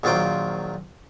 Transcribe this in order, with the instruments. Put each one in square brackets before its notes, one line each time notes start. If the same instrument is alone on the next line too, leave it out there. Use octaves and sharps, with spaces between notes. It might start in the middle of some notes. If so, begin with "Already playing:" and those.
[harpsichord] A#1 D#3 F#3 F4 C5 D6